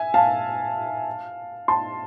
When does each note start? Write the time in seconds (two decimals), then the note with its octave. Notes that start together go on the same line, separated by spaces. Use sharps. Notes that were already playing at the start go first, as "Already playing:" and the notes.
Already playing: E5 G#5
0.14 F5 A5
1.68 A5 C6